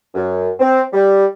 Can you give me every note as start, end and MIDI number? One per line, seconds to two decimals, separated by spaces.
0.15 0.50 42
0.59 0.80 60
0.93 1.24 55